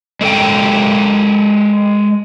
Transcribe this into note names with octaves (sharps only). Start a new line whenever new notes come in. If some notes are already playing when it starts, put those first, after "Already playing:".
G#3 A4 A#4 G5